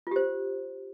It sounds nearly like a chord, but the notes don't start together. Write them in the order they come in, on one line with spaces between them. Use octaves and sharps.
F4 G4 C5